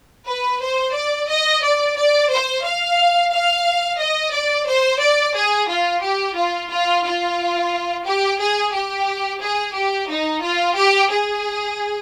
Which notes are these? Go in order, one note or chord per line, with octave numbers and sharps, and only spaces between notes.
B4
C5
D5
D#5
D5
D5
C5
F5
F5
D#5
D5
C5
D5
G#4
F4
G4
F4
F4
F4
G4
G#4
G4
G#4
G4
D#4
F4
G4
G#4